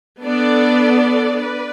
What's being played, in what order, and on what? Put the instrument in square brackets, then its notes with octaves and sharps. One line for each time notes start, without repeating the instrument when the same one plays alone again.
[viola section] B3 D4 A4 D5
B4 D5